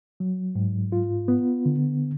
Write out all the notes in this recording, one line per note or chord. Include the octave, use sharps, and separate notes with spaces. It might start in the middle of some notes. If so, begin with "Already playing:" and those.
F#3
G#2
F4
B3
D3